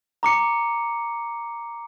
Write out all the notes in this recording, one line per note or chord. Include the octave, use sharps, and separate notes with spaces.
A#5 D6 C#7